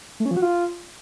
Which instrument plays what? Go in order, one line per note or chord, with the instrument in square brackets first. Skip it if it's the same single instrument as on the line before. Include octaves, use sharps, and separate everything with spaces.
[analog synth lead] A3
C#4
F3
F#4
F4